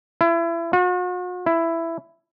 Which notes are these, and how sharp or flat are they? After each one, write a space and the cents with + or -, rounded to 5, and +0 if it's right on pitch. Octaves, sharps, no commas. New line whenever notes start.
E4 +30
F#4 -45
E4 +10